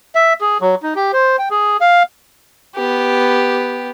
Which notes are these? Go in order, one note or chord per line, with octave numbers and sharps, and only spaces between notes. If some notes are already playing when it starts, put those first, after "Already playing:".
E5
G#4
F#3
D#4
G4
C5
G5
G#4
F5
B3 G4